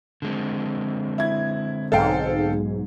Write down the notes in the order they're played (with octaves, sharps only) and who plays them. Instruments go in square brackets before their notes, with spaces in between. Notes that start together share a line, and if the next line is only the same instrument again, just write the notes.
[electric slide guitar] D3 G#3 C4
[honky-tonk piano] E4 G#6
[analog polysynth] B1 G#2 [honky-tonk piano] A4 F5 G5